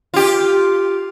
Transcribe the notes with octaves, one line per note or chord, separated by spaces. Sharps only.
F4 G4